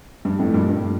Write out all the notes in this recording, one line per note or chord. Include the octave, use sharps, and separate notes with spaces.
G2
F2 A2
G2 A#2
G2